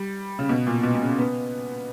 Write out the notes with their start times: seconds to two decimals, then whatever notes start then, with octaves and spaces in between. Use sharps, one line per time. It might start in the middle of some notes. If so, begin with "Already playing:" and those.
Already playing: G3
0.39 C#3
0.49 B2
0.67 A#2
0.83 B2
0.95 B2
1.02 C#3
1.18 B3